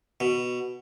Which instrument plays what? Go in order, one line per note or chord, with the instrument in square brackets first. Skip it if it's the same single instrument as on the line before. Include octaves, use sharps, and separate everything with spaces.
[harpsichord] B2